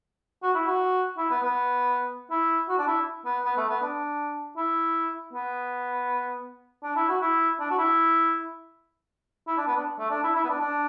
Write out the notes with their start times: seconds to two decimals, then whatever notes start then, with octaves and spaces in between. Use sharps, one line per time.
0.43 F#4
0.55 E4
0.67 F#4
1.18 E4
1.30 B3
1.43 B3
2.31 E4
2.69 F#4
2.79 D4
2.88 E4
3.25 B3
3.45 B3
3.57 A3
3.69 B3
3.83 D4
4.57 E4
5.33 B3
6.84 D4
6.96 E4
7.09 F#4
7.21 E4
7.60 D4
7.71 F#4
7.78 E4
9.47 E4
9.58 D4
9.67 B3
9.77 D4
9.99 A3
10.10 D4
10.24 E4
10.35 E4
10.44 B3
10.49 D4
10.61 D4